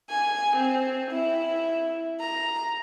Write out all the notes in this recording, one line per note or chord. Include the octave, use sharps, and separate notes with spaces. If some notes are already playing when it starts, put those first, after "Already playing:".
G#5
C4
E4
A#5